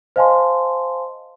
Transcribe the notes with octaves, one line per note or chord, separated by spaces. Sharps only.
C5 D#5 F5 G#5 A5 C6